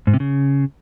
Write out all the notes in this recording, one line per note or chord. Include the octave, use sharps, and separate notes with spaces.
G#2
C3
C#3